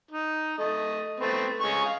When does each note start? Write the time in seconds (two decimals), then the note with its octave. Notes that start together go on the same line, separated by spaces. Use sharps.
0.11 D#4
0.58 A3 D#5
1.20 A3 B3 C4
1.61 G#3 C#4 C#6
1.85 F5